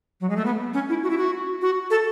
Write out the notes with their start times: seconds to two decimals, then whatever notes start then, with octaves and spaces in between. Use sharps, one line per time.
0.21 F#3
0.30 G#3
0.37 A3
0.45 B3
0.74 C#4
0.89 E4
1.03 F#4
1.10 E4
1.18 F#4
1.62 F#4
1.90 A4